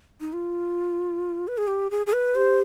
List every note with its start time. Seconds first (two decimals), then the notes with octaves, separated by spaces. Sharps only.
0.21 D#4
0.33 F4
1.48 B4
1.58 G#4
1.67 G4
1.91 G#4
2.07 G#4
2.13 B4
2.35 G4 C5